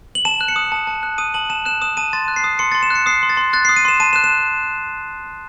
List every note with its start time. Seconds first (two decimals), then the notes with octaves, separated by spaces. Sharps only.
0.15 F#7
0.25 A5 E7
0.41 F#6
0.48 C#7
0.56 D#6
0.72 A5
0.87 A5
1.03 F#6
1.18 D#6 D#7
1.34 A5 F#7
1.50 A5 E7
1.65 F#6 E7
1.82 D#6 E7
1.97 A5 D#7
2.13 C6 A6
2.28 F#6
2.36 C7
2.44 D#6
2.59 C6 C#7
2.72 C6 A6
2.83 E7
2.90 F#6
2.95 C#7
3.06 D#6 C7
3.23 C6
3.30 A6
3.37 C6
3.53 F#6 A6
3.65 D#6 C7
3.76 D#7
3.85 C6 E7
4.00 A5 D#7
4.13 E7
4.16 F#6
4.24 E7